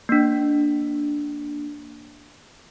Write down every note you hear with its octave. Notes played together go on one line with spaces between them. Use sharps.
A#3 D4